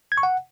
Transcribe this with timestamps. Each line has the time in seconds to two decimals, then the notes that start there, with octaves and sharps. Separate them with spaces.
0.12 G#6
0.18 C#6
0.23 F#5